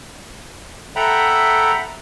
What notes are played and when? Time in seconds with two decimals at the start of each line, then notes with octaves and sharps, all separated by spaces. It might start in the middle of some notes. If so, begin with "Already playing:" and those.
0.96 A4 E5 F#5 G5 A#5 B5